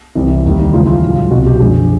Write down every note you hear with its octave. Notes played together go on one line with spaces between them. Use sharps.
C2 C3 E3 G3
D#2 D#3 G3
C#2 C#3 E3 G#3 F4
F4
A2 F#3
C2 B2 F#3 F#4
G4
F#2 D3 F3 G#3 G#4